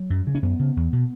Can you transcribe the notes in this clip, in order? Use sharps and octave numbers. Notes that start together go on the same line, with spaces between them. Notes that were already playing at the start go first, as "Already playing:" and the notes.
Already playing: F#3
F#2
C#3
C#4
F#2 B3
C#3
E2
B2